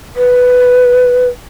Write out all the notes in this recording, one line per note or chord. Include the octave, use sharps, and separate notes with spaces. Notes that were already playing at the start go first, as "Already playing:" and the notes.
B4